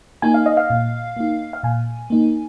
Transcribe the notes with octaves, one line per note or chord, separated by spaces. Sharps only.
A#3 D#4 G#5
F5
D#5
F5
A#2
A#3 D#4
F5
A#2 G#5
A#3 D#4